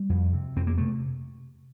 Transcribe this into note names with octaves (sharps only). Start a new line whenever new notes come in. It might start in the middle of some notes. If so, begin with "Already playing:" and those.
Already playing: G3
F2
C3
F2 C4
A#3
C3 A3